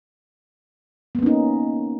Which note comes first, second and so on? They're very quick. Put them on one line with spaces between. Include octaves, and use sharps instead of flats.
B3 A#3 C#4 D#4